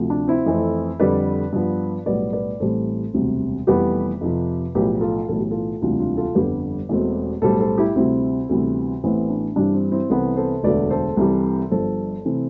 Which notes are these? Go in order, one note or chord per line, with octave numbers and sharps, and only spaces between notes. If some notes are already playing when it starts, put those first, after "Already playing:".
Already playing: D2 C3 F3
D4
C4 E4
F2 E3 A3 C4
F2 D3 G3 B4 D5
G2 F3 B3
B1 A2 G3 B3 B4 D5
B4 D5
A1 A2 E3 G3 C4 A4 C5
E1 D2 C3 G3 C4
F1 F2 E3 G3 B3 G4 B4
F2 C3 F3
B1 A2 F3 G4 B4
F4 A4
B1 A2 E3 A4
G4
F4 A4
E1 D2 C3 E3 G3 D4 F4
D4 F4
F4 A4
G1 F2 D3 G3 G4 B4
E1 E2 B2 A3 C4
B1 A2 G3 A4 C5
A4 C5
E4 G4
D2 C3 G3 C4 E4
D2 C3 E3 G3 B3
A1 A2 E3 B3 C4 E4
D4
G2 E3 G3 C4 D4
C4
C4 E4
C2 C3 E3 B3 A4 C5
A4 C5
E1 D2 D3 A3 B4 D5
A4 C5
C2 C3 E3 G3
G1 G2 F3 A4 C5
C3 E3 A3 C4